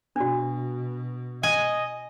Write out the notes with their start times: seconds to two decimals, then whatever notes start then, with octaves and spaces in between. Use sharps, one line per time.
0.16 B2 D4 F#4
1.43 D#5 G#5